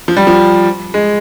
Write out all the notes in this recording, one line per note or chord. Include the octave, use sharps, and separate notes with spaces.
F3
G3
F3
G#3